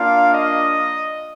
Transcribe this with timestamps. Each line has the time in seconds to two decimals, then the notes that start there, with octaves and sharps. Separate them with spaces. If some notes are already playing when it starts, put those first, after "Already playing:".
Already playing: A#3 D4 F4 F5
0.33 D#5